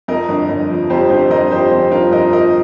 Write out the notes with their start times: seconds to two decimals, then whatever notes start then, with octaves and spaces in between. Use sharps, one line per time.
0.08 F2 A#4 D#5
0.29 G1
0.49 G1
0.70 F3
0.90 F2 G4 C5
1.10 G1 G4 C5
1.30 G1 A#4 D#5
1.51 F3 G4 C5
1.71 F2 G4 C5
1.91 G1 F4 A#4
2.12 G1 A#4 D#5
2.32 F3 A#4 D#5